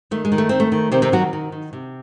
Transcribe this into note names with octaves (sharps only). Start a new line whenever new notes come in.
D#3 A3
G#3
D#3
A3
D#3 C4
A3
D#3
C3 D#3 C4
C3 C4
D#3 F#3 F#4
D#3
D#3
C3